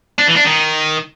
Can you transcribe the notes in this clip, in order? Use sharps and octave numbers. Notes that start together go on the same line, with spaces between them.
D4
E3
D4
D#3